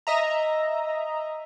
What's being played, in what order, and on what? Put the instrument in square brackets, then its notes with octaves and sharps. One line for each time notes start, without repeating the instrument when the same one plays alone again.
[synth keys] D#5 E5 A#5